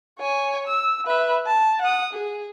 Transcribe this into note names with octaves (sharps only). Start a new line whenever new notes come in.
C#5 G#5
E6
B4 E5
A5
F#5 D#6
G#4